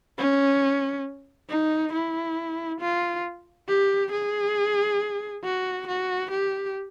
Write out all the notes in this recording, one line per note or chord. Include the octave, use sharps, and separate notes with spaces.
C#4
D#4
E4
F4
G4
G#4
F#4
F#4
G4